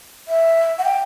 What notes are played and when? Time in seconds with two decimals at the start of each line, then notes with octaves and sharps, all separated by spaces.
0.28 E5
0.79 F#5
0.84 G5